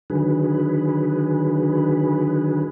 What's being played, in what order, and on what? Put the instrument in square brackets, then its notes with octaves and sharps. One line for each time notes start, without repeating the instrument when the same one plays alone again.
[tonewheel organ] D3 D#3 F#3 G#4 B4